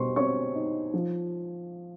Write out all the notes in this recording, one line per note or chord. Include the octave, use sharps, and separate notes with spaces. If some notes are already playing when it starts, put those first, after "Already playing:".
Already playing: B2 G3 C5 C6 C#6
C4 C#5 C#6
D#4
F3